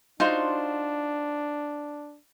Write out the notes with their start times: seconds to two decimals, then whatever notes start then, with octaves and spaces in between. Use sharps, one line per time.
0.20 D4 D#4 F4 F#4 C5